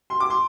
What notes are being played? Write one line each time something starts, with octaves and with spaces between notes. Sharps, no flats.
C6
D6
C6